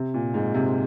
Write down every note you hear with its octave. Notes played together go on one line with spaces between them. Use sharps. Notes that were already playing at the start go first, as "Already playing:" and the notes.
Already playing: C3
A#2
G#2
C3